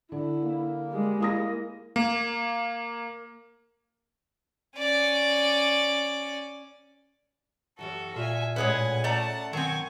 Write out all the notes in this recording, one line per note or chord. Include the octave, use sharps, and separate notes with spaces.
D3 E4
A#3
G3 G#3
A#3 E4 D#6 A#6
A#3
C#4 D5
F#2 E3 G3 F#4 A4
A#2 F4 F#4 A4 E5 G#5
A2 G#3 C#4 G#4 B4 F#5 G#5
A3 D5 F#5 A5 A#5
G2 B2 D#3 F#3 C4 G#5 C#6